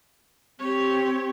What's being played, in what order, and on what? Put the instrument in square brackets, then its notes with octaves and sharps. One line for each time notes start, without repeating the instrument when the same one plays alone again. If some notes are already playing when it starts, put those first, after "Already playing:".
[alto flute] C4 [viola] G4 C#5